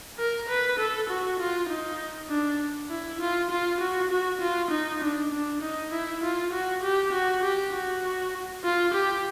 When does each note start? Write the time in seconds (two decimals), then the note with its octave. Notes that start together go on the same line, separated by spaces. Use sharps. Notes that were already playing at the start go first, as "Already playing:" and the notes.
0.18 A#4
0.49 B4
0.79 A4
1.09 F#4
1.39 F4
1.69 D#4
2.29 D4
2.90 E4
3.20 F4
3.50 F4
3.80 F#4
4.11 F#4
4.41 F4
4.71 D#4
5.01 D4
5.32 D4
5.62 D#4
5.91 E4
6.23 F4
6.52 F#4
6.83 G4
7.13 F#4
7.43 G4
7.73 F#4
8.64 F4
8.94 G4